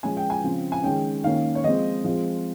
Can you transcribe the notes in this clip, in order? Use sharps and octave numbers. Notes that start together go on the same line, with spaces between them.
F3 G#3 C#4 G#5
G5
G#5
C#3 F3 C4
G#5
D#3 G#3 C#4 G5
D#3 A#3 C#4 F5
C#5
F3 G#3 C4 D#5
F3 G#3 C4